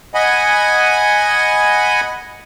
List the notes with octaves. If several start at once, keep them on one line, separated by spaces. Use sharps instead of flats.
D#5 F#5 G#5 B5